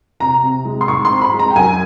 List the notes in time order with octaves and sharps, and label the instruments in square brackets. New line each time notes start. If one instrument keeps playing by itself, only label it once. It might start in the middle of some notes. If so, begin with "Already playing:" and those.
[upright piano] C3 A#5
C3
G#3
C6
G#2 C#6
C6
C4
B5
G#3
A#5
G5
F#2 G#5